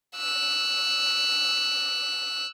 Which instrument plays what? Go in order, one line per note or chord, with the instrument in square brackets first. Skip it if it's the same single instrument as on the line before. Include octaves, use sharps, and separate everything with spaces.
[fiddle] E6 F#6